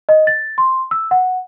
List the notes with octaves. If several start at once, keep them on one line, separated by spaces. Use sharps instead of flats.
D#5
A6
C6
E6
F#5